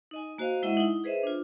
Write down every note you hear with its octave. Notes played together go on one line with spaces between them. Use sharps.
D#4 D#5 G#5
A#3 F#4 C5 D#5 F5
G#3 E4 D#5 E5 F#5
D#4 E4
G#4 B4 C5 D#5 E5
D4 F4